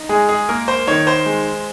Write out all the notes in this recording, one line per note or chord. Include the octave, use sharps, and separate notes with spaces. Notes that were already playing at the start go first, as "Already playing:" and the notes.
Already playing: D#4
G#3 G#4
G#4
A#3 A#4
C5
D#3 C#5
C5
G#3